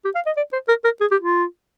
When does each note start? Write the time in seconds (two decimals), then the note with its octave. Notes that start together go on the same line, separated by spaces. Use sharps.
0.05 G4
0.15 F5
0.26 D#5
0.37 D5
0.52 C5
0.68 A#4
0.84 A#4
1.01 G#4
1.11 G4
1.21 F4